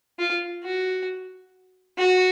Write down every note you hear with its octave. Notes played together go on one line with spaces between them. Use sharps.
F4
F#4
F#4